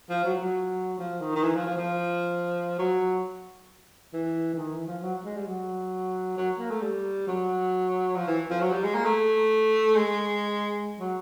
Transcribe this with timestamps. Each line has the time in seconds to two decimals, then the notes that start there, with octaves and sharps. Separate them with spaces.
0.10 F3
0.24 F#3
0.39 F#3
0.99 F3
1.21 D#3
1.35 D#3
1.44 E3
1.55 F3
1.66 F3
1.77 F3
2.79 F#3
4.13 E3
4.54 E3
4.58 D#3
4.72 E3
4.87 F3
5.02 F#3
5.25 G#3
5.36 G3
5.47 F#3
6.37 F#3
6.59 A#3
6.71 A3
6.82 G3
7.27 F#3
8.16 F3
8.27 E3
8.50 F3
8.61 F#3
8.72 G3
8.83 G#3
8.95 A#3
9.05 A3
9.96 G#3
11.00 F#3